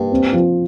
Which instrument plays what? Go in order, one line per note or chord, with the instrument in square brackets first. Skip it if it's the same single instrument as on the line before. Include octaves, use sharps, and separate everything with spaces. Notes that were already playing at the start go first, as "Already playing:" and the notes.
Already playing: [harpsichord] G2 [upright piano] A#3
[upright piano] C4
F3